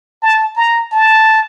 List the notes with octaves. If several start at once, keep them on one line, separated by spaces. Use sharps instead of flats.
A5
A#5
A5